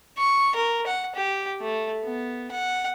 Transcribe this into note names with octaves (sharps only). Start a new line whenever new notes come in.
C#6
A#4
F#5
G4
A3
B3
F#5